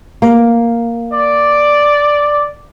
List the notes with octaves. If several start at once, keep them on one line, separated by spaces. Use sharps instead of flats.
A#3
D5